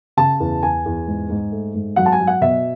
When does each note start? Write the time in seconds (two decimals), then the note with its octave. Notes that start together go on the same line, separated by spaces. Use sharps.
0.17 C#3 A5
0.40 E2
0.63 E2 G#5
0.85 E2
1.07 G#2
1.30 G#2
1.52 A3
1.74 G#2
1.96 F#3 F#5
2.06 A5
2.12 G#5
2.20 F#3
2.27 F#5
2.41 B2 E5